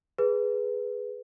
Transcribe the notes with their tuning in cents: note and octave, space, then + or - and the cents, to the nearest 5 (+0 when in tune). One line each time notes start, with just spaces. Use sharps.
G#4 +0 B4 +0